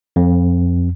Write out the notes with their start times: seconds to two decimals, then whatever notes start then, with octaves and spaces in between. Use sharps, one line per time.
0.16 F2